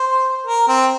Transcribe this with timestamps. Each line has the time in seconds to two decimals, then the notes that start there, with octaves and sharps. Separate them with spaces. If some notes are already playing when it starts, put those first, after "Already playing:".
Already playing: C5
0.46 A#4
0.68 C4